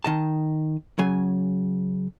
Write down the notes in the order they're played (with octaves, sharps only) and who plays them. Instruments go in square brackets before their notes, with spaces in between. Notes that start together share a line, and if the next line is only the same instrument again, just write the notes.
[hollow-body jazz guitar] D#3 D#5 A5
C#3 F#3 G#5